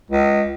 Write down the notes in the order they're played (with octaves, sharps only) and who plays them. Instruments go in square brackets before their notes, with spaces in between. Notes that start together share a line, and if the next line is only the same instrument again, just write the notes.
[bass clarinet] C#2